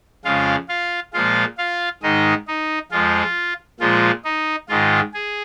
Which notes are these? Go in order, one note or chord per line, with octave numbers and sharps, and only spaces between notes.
F2 C#3 G#3 F4 F5
F4 F5
A#2 F3 G#3 F4 F5
F4 F5
G#2 D#3 G#3 D#4 D#5
D#4
F2 F3 G#3 F4
A#2 F3 G#3 F4
D#4
G#2 D#3 G#3 F4
G#4